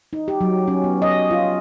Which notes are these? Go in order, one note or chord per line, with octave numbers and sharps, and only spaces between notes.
D#4
G4
F#3
C#4
B3
D#5
F4